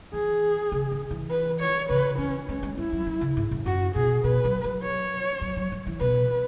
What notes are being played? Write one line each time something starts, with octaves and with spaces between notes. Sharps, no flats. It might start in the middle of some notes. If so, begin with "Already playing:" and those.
E3 G#4
C#3
C#3
E3
B4
C#5
C#3 B4
E3 C#4
G#3 C#4
G#3
G#3 E4
F#3
F#3
C#3
G#2
F#2
F#2 F#4
B2 G#4
B2 B4
F#3
F#3
C#5
F#3
F#3
F#3
E3
B2 B4